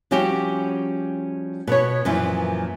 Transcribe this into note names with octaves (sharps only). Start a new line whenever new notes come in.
F3 G3 C#4 F#4 G4
B2 B3 C#5
F#2 A#2 E3 F3